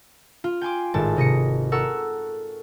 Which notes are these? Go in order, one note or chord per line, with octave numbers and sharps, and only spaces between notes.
F4
G5 G#5 C6 D6
G#1 A2 G#3 A5
C3 D#5 A#6 C#7
A4 A#4 F#5 C#6 E6